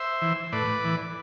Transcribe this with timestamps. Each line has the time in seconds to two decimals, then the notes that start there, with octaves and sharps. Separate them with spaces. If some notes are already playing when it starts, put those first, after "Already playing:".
Already playing: C5 E5
0.22 E3
0.52 A2 B4 D5
0.84 E3